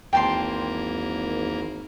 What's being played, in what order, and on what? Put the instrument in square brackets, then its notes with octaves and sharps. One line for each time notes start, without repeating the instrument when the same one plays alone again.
[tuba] G#1 [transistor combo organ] E2 A#3 [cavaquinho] G5 A5 C6